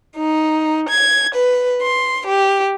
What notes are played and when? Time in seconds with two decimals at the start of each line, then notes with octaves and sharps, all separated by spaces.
0.16 D#4
0.89 G#6
1.35 B4
1.82 C6
2.27 G4